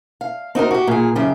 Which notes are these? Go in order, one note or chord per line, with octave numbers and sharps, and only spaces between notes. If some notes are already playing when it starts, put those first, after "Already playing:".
F5
C4 D#4 F#4 A#4
F#4 G4
A#2 G#4
F#2 C#3 G4